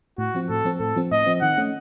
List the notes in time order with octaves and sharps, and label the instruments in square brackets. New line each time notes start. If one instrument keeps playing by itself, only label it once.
[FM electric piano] A2 [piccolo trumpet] F#4
[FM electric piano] F3 C4
[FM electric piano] A2 [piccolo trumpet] A4
[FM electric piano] F3 C4
[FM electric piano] A2 [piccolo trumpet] A4
[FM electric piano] F3 C4
[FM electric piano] A2 [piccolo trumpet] D#5
[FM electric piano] F3 C4
[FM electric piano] D#3 [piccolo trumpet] F#5
[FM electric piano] A3 C#4